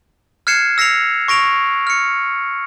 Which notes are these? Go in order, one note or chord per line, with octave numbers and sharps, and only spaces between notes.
F6 F#6 G#6 C7 C#7 E7
E6 A#6 C7 C#7 F7
C#6 A#6 D7 F7
F6 C#7